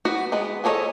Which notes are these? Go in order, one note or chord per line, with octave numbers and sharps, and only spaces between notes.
B3 F#4 F#5
G#3 B3
F3 G#4 A4 C#5 D#5